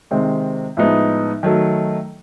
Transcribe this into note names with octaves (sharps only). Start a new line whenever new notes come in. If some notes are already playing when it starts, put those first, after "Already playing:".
C3 D#3 G#3 C4
A2 F3 G#3 B3 D#4
D#3 F#3 A3